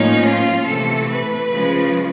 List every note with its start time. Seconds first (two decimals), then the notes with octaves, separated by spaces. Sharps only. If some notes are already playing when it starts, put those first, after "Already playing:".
Already playing: A2 F3 A#3 C#4 D#4
0.26 F4
0.68 C3 E3 A3 A4
1.10 B4
1.52 C#3 F3 G#3